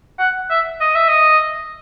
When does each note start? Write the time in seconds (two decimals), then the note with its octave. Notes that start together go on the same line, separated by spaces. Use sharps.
0.19 F#5
0.50 E5
0.81 D#5
0.95 E5
1.08 D#5